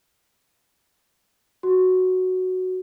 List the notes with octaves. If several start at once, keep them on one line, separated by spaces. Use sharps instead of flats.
F#4